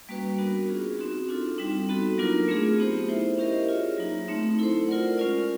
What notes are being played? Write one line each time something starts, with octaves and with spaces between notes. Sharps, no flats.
G3 A#3 C#4 F#4 B4
B3 D4 F#4 A#4
C#4 F4 G#4
C4 D#4 F#4
D4 F4 A4
G3 C4 D#4
B3 D#4 F#4 A4
F#3 A#3 D4 F4 A#4
A3 C4 F4 G#4
B3 D#4 G4 C5
E4 A4 C5 E5
C#4 E4 G4 A#4 D#5
F4 G#4 C#5 E5
F#3 A#3 D#4
A3 C4 D#4
E4 A4 C5
F4 A#4 D5 F#5
G#3 C#4 F4 A#4 D5